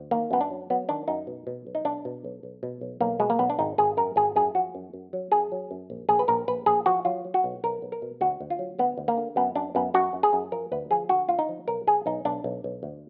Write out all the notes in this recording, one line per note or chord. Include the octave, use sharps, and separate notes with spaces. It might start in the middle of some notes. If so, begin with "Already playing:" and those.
Already playing: D2
D#3 A#3
F#2 B3
D4
F#3
F#3 B3
D#3 D4
F#2 D#4
B2
B2
B1
D#4
B1 D4
B2
B1
B1
B2
B1
B1 A#3
B2 G#3
A#3
B1 B3
D4
G#1 D#4
G#1 G#4
F#2 A#4
G#1 G#4
F#2 G#4
F3 F#4
F#2
F#2
F#3
F#2 G#4
F#3
F#2
A#1
A#1 G#4
B4
A#1 A#4
A#1 B4
A#1 G#4
F3 F#4
F#3 F4
F#3
F#4
B1
B1 A#4
B1
A#4
B2
D2 F#4
D2
F4
F#3
D2 B3
D2
A#3
D3
F#2 B3
F#2 D4
F#2 B3
F#2 F#4
F#2
G#4
F#2
F3 A#4
D2 B4
F3 G#4
D3 F#4
D2 F4
D#4
F3
B1 A#4
B1 G#4
B1 D#4
B1 D4
B1
B1
D2